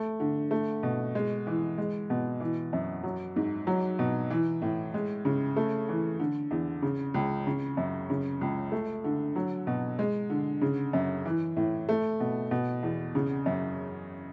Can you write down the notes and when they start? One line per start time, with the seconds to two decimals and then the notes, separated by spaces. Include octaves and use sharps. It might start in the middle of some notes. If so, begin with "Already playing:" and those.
Already playing: A3
0.20 D3
0.51 A3
0.83 B2
1.15 G#3
1.47 E3
1.78 G#3
2.10 B2
2.40 E3
2.73 F#2
3.03 F#3
3.36 G#2
3.67 F#3
3.99 B2
4.30 E3
4.62 A2
4.94 G#3
5.25 C#3
5.56 A3
5.89 E3
6.19 D3
6.51 E2
6.82 C#3
7.14 C#2
7.47 C#3
7.77 F#2
8.10 C#3
8.41 C#2
8.72 A3
9.04 D3
9.36 F#3
9.67 B2
9.99 G#3
10.30 D3
10.61 C#3
10.93 F#2
11.26 E3
11.56 A2
11.89 A3
12.20 B2
12.51 B2
12.83 E2
13.15 C#3
13.46 F#2